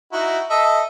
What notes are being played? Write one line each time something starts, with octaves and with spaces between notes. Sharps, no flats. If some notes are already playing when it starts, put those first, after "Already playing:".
D#4 E4 F#4
A4 D#5 E5